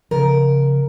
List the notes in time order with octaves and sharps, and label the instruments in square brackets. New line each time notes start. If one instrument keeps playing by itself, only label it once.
[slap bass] C#3 F3 [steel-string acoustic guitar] A#4